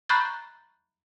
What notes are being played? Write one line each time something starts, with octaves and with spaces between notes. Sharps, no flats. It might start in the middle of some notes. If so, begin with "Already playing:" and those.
A#5 B5 C#6 F#6 G6 A6